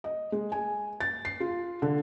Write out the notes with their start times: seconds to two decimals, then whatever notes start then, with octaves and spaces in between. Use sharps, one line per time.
0.04 D#5
0.32 G#3
0.52 G#5
1.00 A6
1.25 C7
1.40 F4
1.82 D3